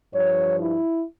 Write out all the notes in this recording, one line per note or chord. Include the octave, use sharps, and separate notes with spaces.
G2 F3 C#5
E4